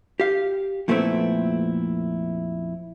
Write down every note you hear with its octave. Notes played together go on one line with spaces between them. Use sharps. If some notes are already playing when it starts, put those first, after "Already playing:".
G4 F5
F2 A#2 A3 B3 C4 E4